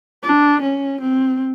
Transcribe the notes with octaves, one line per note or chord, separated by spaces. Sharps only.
D4
C#4
C4